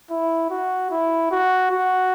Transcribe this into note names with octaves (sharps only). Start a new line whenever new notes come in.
E4
F#4
E4
F#4
F#4